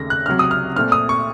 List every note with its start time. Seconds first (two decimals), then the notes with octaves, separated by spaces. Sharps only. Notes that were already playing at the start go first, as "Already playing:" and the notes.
Already playing: D#2 C#3 A3 A#6
0.10 F#6
0.26 C#2 C3 F#3 F6
0.39 D#6
0.51 F6
0.76 A#2 A3 C4 F6
0.92 D#6
1.09 C#6